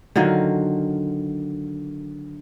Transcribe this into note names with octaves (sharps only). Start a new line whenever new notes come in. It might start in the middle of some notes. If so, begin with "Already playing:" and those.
D3 D#3 F#3 F4